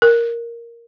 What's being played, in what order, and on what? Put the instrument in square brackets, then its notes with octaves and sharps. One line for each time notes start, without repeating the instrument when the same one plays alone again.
[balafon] A#4